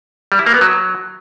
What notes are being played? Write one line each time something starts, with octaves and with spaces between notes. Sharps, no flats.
G3
E4
A#3
B3
F#3